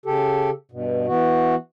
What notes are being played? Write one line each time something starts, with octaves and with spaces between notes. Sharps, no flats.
C#3 G4 A4
G2 B2
E3 B3 F#4